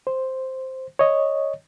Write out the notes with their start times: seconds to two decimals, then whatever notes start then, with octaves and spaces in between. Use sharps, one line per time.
0.07 C5
0.99 C#5 D#5